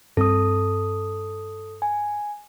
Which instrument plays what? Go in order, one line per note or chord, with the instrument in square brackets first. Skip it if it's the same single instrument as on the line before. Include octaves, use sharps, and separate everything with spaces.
[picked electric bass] G2 C4 [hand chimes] A4 D#6
[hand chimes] G#5